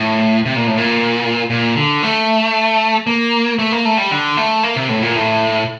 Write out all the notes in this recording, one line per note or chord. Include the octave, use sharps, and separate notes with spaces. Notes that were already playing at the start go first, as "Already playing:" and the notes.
Already playing: A2
C3
A#2
A2
A#2
A#2
D3
A3
A#3
A3
A#3
A3
G3
D3
A3
A#3
C3
A2
A#2
A2